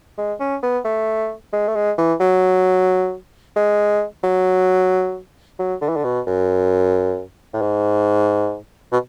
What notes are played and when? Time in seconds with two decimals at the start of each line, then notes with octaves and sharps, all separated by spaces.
0.18 G#3
0.40 C#4
0.63 B3
0.85 A3
1.53 G#3
1.68 A3
1.76 G#3
1.98 E3
2.20 F#3
3.56 G#3
4.24 F#3
5.59 F#3
5.81 D3
5.89 E3
5.96 D3
6.04 B2
6.27 F#2
7.54 A2
7.62 G#2
8.92 B2